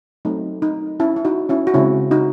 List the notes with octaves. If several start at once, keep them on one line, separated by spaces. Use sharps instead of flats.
F#3 A3 C4 D#4
D#4
C#4 E4
E4
D#4 F#4
C#4 E4
F#4
C#3 G#3 C4 C#4 E4
D#4 F#4